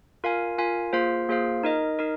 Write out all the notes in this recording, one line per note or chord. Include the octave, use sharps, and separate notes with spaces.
F4 A#4 F5 G#5
F4 A#4 F5 G#5
A#3 F4 G#4 C5 F5
A#3 F4 G#4 C5 F5
D#4 A#4 D#5
D#4 A#4 D#5